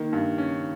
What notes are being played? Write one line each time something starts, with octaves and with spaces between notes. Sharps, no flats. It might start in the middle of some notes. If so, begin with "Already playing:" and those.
Already playing: D#3 A#3
G2
C#4